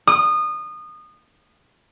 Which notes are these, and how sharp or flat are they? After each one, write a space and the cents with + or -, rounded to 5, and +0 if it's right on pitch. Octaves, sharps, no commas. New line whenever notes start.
D#6 -25